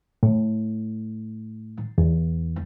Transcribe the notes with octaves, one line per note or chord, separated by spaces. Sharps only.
A2
E2